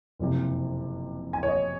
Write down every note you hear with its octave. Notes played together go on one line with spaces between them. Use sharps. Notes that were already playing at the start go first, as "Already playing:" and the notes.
F#1 F2 C3
G#5
C#5
D#5